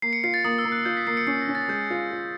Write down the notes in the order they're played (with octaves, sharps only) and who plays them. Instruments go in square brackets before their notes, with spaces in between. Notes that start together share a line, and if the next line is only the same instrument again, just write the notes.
[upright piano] A#3 [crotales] C7
[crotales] C#7
[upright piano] F4 [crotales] C7
[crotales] A6
[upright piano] A#3 [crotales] D#6
[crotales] E6
[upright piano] A#3
[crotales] F#6
[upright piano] F4 [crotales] G6
[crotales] B6
[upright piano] A#3 [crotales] C7
[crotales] C#7
[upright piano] C#4 [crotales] C7
[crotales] A#6
[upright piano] C#4
[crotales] A6
[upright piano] G#3 [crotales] G6
[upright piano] F4
F4